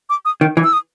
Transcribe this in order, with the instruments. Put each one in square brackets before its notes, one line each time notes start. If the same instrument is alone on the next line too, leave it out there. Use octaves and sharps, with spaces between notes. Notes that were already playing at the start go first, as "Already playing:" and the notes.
[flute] D6
D#6
[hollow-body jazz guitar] D#3
E3
[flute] E6
D#6